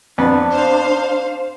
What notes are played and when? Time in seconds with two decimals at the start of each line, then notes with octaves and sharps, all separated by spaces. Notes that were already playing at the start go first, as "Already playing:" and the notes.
0.18 F2 B3 D4
0.52 C5 F5